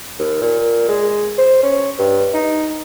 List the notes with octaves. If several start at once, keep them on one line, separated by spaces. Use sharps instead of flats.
D#2
A#2
G#3
C5
C#4
G2
D#4